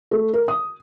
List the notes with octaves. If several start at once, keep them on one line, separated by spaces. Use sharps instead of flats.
A3
A#4
D#6